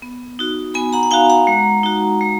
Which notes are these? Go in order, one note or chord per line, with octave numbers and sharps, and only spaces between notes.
B3
D#4 F#4
B3 G#5 B5
F#5 A#5
F#5
D#4 F#4 F5 G#5
F#5 A#5
G#3
D#4 F#4
G#3